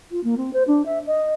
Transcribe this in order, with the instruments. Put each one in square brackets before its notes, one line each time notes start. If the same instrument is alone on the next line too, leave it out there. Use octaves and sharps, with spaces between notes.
[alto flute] F4
A#3
C4
C5
D4
E5
D#5